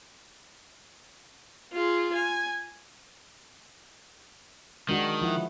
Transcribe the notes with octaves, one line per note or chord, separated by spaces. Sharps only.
F4 G#4
G#5
D#3 G#3 D4 F#4
F3 E4 F#5